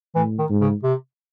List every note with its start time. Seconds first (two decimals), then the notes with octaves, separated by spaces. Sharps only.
0.15 A2 E3
0.39 D#3
0.49 G#2
0.61 C#3
0.83 C3